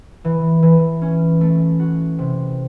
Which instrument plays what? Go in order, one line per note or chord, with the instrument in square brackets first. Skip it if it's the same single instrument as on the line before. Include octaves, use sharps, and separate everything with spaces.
[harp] E3
E3
C#4
A3
F#4
C3